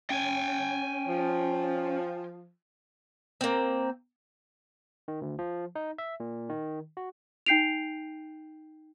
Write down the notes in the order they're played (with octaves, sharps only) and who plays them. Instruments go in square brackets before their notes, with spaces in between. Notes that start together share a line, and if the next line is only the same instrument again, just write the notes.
[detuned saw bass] C#4 [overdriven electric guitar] G5 G#5
[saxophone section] F3
[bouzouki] A#3 C4
[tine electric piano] D#3
D2
F3
D#4
E5
A#2
D#3
F#4
[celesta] D#4 G5 G6 C7 D7 F7